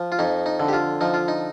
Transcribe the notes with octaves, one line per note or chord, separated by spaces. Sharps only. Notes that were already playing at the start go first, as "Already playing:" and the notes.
Already playing: F3
F4
F2 D#4
D#4
D3
G4
F4
F3 D#4
F4
D#4